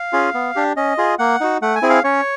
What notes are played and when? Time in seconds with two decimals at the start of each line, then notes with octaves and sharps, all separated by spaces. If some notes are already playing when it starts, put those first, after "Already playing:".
Already playing: F5
0.13 C#4 F4 G#4
0.34 B3
0.55 D4 G4
0.77 C#4 D#5
0.98 F4 G#4
1.19 A#3 F#5
1.41 D#4 F#4
1.62 A3 F#5
1.76 G#5
1.82 C4 E4 G#4
1.90 F5
2.04 C#4 C#5